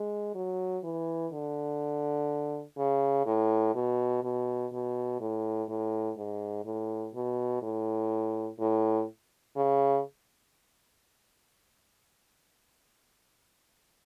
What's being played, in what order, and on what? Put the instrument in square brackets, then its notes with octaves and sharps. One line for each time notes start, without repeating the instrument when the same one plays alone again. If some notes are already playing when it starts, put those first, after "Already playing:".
Already playing: [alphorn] G#3
F#3
E3
D3
C#3
A2
B2
B2
B2
A2
A2
G#2
A2
B2
A2
A2
C#3